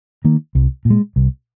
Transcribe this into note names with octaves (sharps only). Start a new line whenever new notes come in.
D#3 A#3
C2
A#2
G#3
C2